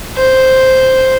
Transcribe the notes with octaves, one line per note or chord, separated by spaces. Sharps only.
C5